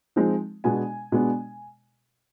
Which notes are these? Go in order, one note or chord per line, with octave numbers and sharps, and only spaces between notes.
F3 G#3 C4 D#4
B2 G#3 B3 D4 G#5
B2 G#3 B3 D4